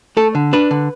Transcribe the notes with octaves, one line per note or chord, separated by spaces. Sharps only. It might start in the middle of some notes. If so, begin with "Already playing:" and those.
A3 A4
D3
D4 B4
D3